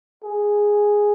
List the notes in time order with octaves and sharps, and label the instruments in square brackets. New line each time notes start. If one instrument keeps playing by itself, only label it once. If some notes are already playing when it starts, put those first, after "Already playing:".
[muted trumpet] G#4